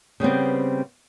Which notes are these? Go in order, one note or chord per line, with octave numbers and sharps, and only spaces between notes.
C#3 G3 B3 C4